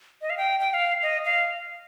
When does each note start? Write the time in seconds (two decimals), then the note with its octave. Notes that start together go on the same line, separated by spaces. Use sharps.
0.21 D#5
0.30 F5
0.38 G5
0.60 G5
0.70 G5
0.74 F5
1.02 D#5
1.25 F5